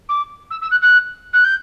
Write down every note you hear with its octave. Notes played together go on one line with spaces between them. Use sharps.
D6
E6
E6
F#6
F#6
F#6
G6